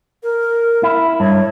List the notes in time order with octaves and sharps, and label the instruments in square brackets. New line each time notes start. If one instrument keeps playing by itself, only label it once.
[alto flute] A#4
[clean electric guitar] E4
[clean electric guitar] G2 [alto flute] C#5